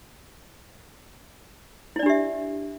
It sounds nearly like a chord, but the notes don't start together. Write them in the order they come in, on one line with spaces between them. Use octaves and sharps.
E4 D5 D4 G4 E5